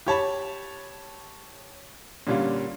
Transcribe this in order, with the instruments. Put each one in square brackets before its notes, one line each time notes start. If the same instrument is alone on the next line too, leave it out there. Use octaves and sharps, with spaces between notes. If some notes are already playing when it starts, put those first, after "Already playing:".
[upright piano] G4 C#5 A5 B5
A#2 D3 G3 C#4 F4